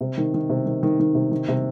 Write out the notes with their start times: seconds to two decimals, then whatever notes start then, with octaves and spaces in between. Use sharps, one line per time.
0.01 C3
0.17 D#3
0.34 D#3
0.49 C3
0.66 D#3
0.83 D#3
0.99 D#3
1.15 C3
1.31 D#3
1.48 C3